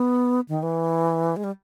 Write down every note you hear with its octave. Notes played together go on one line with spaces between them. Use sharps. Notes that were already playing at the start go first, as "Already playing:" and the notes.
Already playing: B3
D#3
E3
G#3
G3